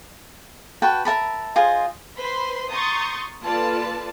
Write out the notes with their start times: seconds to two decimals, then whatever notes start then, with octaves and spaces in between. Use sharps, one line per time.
0.82 F#4 B4 G5 A5
1.05 A#4 E5 A5 B5
1.56 F4 G#4 C5 D#5
2.18 B4 C5 B5 C6
2.70 A#5 C6 C#6 D#6 G6 A6
3.42 A#3 F4 A4 B4 D5 A5